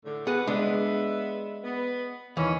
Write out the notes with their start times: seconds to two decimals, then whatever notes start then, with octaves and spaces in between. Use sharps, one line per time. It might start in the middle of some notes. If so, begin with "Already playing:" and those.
0.05 A2 D3
0.27 B3 G#4 B4 F#5
0.47 G#3 B3 D4 E5
1.63 B3
2.37 D#2 E3 C#4